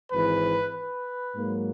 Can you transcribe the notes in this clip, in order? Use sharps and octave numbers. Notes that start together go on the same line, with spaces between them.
G#1 G#2 E3 B4
B4
G#2 F#3 A#3